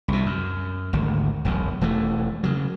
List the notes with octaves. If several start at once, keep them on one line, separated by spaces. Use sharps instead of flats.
C2 B2
F#2
G#1 D2
E1 B1 F#2
E1 E3 A3
C#3 F#3